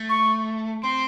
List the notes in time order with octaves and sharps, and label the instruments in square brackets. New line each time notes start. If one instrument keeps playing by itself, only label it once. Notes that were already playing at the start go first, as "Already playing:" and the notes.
Already playing: [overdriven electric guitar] A3
[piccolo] C#6
[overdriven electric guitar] C4 [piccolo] C6